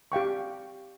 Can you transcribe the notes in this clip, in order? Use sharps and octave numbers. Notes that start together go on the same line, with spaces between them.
G4 F5 G5 C#6